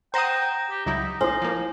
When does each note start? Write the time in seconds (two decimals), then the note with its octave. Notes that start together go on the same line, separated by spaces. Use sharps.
0.14 C5 F#5 G5 A#5 D#6 A#6 E7
0.71 G4
0.86 C#2 F#3 D#4 E4
1.21 A#1 E4 C5 G#5
1.42 F3 A#3